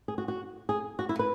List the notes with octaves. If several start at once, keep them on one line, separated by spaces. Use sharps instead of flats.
G#4
F#4
F#4
G#4
F#4
E4
B4